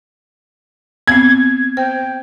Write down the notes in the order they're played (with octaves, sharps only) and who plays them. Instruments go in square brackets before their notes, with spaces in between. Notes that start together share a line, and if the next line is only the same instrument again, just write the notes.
[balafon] B3 C4 [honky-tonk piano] G#6
[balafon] C5 [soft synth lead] G5